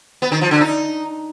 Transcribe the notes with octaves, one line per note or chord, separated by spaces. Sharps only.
B3
D#3
F3
D3
D#4